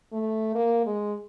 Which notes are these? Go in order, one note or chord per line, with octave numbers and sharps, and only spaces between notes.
A3
A#3
G#3